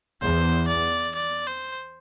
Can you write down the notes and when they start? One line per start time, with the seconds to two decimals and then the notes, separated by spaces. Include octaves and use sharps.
0.21 E2 C5
0.68 D5
1.15 D5
1.47 C5